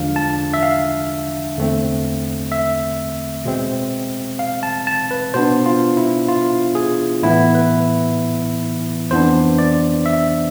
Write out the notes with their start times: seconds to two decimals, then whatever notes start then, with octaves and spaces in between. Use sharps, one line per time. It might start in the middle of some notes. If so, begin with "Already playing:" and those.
Already playing: E2 D3 F3 G#3 D4 F5
0.16 A5
0.54 E5
0.63 F5
1.57 E2 D3 A3 C4
2.52 E5
3.45 B2 G#3 C4
4.39 F5
4.63 A5
4.87 A5
5.11 B4
5.34 B2 B3 D4 C5
5.66 F4
5.97 E4
6.28 F4
6.75 G#4
7.23 A2 E3 B3 E4
7.55 B4
9.11 F2 E3 B3 D4 C5
9.58 D5
10.06 E5